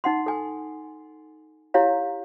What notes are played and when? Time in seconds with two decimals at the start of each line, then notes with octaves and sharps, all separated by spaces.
0.04 D#4 F#5 C6
0.26 A4 G#5
1.74 E4 G4 C#5 F5 A#5